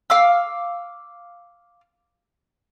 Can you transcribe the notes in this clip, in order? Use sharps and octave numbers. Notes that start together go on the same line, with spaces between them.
F5 D6 E6